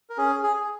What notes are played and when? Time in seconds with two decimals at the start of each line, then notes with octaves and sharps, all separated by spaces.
0.10 A#4
0.18 C#4 G#4
0.43 G#4
0.57 G#4